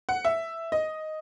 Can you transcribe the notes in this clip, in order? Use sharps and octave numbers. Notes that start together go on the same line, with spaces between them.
F#5
E5
D#5